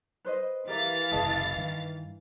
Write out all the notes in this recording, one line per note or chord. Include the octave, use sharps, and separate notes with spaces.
B4 C5 D#5
E3 G4 A#4 E5 F5 A6
F#1 C2 G#4 D#5 A5
G2 D#3